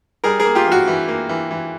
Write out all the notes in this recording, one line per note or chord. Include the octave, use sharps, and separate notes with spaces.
G3 G#4 A#4
G#4 A#4
A#3
F4 G4
E3
F#4
E3
A#3
E3
E3